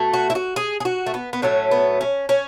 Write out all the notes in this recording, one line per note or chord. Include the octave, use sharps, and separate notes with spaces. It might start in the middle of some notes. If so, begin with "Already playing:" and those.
Already playing: B2 A3
F#4
E4
F#4
G#4
G#4
F#4
A3
B3
B3
A2 F#3 A3 C#4
B3
C#4
C#4